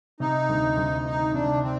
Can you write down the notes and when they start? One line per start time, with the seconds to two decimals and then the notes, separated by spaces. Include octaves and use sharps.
0.20 C3 D#4
0.49 D2
0.77 D2
1.06 D#3 D#4
1.34 C3 D4
1.63 C4